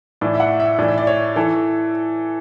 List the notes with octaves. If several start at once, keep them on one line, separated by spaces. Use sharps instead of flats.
A2 E3 D5
E5
F#5
E5
A2 E3 D5
E5
D5
C#5
E3 A4